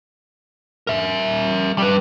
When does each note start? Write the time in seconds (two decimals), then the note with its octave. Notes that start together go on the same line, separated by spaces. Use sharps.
0.87 A#4 E5
1.78 G3 B4